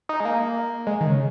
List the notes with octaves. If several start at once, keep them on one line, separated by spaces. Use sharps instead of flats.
D#4
G#3
A#3
G#3
D#3
C#3